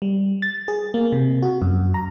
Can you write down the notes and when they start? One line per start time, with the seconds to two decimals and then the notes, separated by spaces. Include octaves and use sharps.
0.02 G3
0.42 A6
0.68 G#4
0.94 A#3
1.12 C3
1.43 F#4
1.62 F#2
1.94 A#5